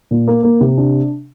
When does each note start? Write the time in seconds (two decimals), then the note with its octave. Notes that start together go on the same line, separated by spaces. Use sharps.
0.11 A#2
0.28 A#3
0.43 A#3
0.61 C3
0.78 D4